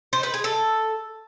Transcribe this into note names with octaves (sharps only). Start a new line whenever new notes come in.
C5
B4
G#4
A4